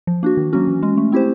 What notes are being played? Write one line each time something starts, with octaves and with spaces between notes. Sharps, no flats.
F3
A#3 D4 F#4
D#3
F#3 A#3 C#4 F#4
E3
G#3 C#4
A3
C4 E4 G4 C5